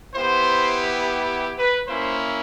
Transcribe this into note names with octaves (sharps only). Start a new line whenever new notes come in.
B3 E4 G4 C5
B4
A#3 C#4 E4 C5